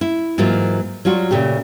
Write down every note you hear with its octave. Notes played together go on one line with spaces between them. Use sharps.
E4
G#2 E3 F#3 A#3 F4
F#3 G3 F4 F#4
A#2 C#3 A3 G4